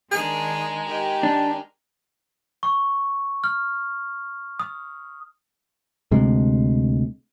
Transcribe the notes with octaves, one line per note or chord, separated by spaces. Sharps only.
D#3 G#3 D4 G#4 A#4
D#3 G4
D4
C#6
F6
D#6
D2 C3 G#3